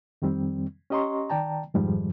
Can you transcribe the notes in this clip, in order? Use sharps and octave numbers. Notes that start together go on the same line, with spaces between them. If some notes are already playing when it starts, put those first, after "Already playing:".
F2 D#3 G3 C4
C#4 G4 D#5 A#5 C6 C#6
D#3 D5 G5 A5 A#5
F2 G#2 D#3 F3 G3 G#3